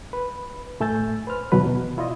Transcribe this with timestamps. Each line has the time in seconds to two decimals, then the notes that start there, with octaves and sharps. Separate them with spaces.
0.13 B4
0.80 A2 A3 G#5 E6 G6 A6
1.27 B4 C5 F6
1.52 D#2 B2 E3 F#3 B4
1.66 B2
1.98 E4 F4 D5 D#5